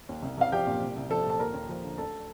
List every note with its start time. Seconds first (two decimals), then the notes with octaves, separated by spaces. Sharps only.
0.09 D#2
0.23 C2
0.37 C2 F5
0.52 F3 G4 G5
0.67 A#2
0.81 C2
0.96 C2
1.10 F3 A4 A5
1.26 A#2 A5
1.39 D#2 A#4 A#5
1.54 D#2
1.69 F3
1.84 D3
1.98 D2 A4 A5